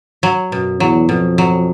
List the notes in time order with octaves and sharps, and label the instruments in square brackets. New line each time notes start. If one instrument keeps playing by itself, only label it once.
[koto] F#3
[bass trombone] F#2 [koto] B2
[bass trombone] E2 [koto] F#3
[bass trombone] F2 [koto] B2
[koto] F#3